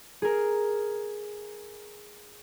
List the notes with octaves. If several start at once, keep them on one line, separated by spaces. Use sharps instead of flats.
G#4 A#4